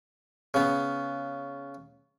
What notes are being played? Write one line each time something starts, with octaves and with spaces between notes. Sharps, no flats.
C#3 B3